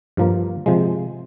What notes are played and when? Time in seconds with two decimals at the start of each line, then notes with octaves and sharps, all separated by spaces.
0.17 G2 F3 A#3
0.66 C3 F3 G#3